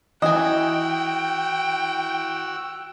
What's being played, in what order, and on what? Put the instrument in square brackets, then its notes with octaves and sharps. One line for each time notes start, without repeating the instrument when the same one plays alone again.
[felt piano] E3 [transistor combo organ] F#4 E6 [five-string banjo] D#5 G#5 [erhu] G5